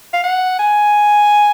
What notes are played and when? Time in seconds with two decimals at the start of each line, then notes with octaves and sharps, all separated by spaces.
0.13 F5
0.24 F#5
0.59 G#5